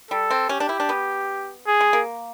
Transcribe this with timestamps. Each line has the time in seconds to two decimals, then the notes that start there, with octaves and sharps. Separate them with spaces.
0.11 G3 A4
0.31 C4
0.49 C#4 G4
0.60 D4
0.69 E4
0.80 D4
0.89 B3
1.67 G#4
1.81 G#3
1.93 A#3